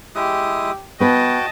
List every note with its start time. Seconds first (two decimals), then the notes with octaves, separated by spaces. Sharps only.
0.15 G#3 E4 G4 D#6
1.00 B3 F#4 B4 D#5 G5 A5